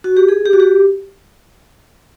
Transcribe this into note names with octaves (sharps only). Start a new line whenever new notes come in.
F#4
G4
G#4
G4
F#4
G4